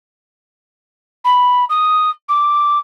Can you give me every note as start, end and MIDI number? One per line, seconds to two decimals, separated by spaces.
1.24 1.64 83
1.69 2.10 87
2.28 2.78 86